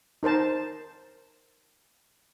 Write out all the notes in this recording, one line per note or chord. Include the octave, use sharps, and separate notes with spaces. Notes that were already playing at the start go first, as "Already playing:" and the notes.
D#4 A#4 C5 A5